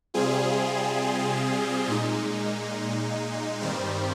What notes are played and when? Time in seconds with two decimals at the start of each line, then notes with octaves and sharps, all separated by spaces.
0.14 C3 G3 C4 F4 G#4
1.88 A#2 G#3 D#4
3.61 G2 D#3 G3 C4